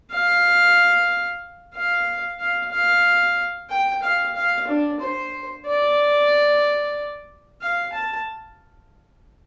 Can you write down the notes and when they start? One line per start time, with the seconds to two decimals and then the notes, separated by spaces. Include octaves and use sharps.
0.11 F5
1.75 F5
2.40 F5
2.71 F5
3.70 G5
4.02 F5
4.36 F5
4.68 D4
5.00 C5
5.66 D5
7.61 F5
7.93 A5